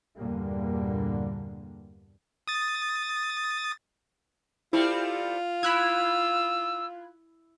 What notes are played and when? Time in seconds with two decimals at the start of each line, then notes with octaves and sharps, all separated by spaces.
0.18 E2 G2 A#2 D3 G3 A#3
2.47 D#6 A6
4.73 G3 A3 C4 E4 F4
5.63 E4 B5 E6 F#6 G#6